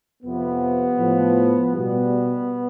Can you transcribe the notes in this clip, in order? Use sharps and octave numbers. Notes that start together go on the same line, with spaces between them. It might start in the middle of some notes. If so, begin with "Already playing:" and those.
F2 C3 F3 B3
A2 F3
B2 G3 B3